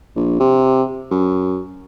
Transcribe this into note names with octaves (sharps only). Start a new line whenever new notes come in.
A#1
C3
F#2